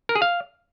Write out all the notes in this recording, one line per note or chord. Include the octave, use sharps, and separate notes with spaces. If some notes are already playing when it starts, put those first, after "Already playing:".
A#4
G#4
F5